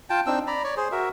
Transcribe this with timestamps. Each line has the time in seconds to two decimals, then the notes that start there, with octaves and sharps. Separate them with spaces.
0.10 F4 G5 A5
0.27 C4 D4 D#4 E6
0.47 D5 A#5 B5
0.64 C#5 D5
0.77 G#4 C5
0.92 F#4 A#4 E5